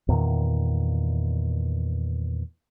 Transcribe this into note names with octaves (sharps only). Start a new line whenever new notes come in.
E2 A#2 D#3